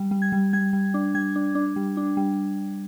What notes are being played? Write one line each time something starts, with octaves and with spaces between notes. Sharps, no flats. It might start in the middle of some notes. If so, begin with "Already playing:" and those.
Already playing: G3
G3
G#6
G3
G3 G#6
G3
D4
G3 G#6
D4
D4
G3
D4
G3